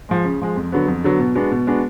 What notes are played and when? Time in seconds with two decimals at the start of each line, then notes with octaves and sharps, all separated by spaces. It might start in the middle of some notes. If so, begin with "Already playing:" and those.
0.09 F3 G#3
0.25 C#3
0.41 F3 G#3
0.56 F2
0.72 D3 F#3 B3
0.88 F2
1.04 D3 F#3 B3
1.20 B2
1.35 G#3 B3 D4 F#4
1.52 B2
1.67 G#3 B3 D4 F#4